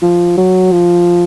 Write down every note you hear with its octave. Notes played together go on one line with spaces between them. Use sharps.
F3
F#3
F3